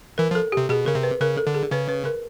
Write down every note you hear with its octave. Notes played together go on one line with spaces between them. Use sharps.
E3 A#4
F3
A4
C3 G4
B2 G#4
C#3 A#4
C3
B4
C#3 A#4
A4
D3
G#4
C#3 B4
B4
A#4